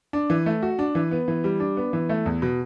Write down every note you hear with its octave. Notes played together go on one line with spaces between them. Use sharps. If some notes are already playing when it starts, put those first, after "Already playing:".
D4
E3
A3
F#4
D4
E3
B3
E3
G3
D4
B3
E3
A3
E2
B2